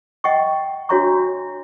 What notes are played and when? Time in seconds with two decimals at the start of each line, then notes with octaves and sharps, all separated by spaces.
0.24 D#5 F#5 G5 C#6
0.89 D4 F#4 C#5 E5 A#5 C#6